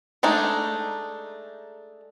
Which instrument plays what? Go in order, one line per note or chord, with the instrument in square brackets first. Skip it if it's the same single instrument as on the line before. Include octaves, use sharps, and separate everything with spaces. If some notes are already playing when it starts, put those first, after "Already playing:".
[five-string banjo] G#3 A3 D4 D#4